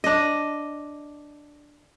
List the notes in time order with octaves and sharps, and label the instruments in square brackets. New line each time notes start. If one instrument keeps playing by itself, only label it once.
[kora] D4 D#5